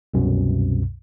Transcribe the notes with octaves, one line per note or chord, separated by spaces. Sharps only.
C2 F#2 B2